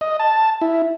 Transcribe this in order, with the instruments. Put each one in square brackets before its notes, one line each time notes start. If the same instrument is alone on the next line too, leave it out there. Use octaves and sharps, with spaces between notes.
[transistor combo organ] D#5
A5
E4